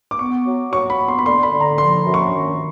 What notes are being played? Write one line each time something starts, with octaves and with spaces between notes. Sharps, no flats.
D6
B3 C#6
F#3
F#3 C#6
B5
B3
C6
B5
D3 C6
B5
D3
A#5
F3 C6
F#2
C#6
D#3